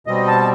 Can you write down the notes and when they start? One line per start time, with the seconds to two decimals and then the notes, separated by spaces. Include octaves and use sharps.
0.07 B2 G3 C4 D#5
0.28 A5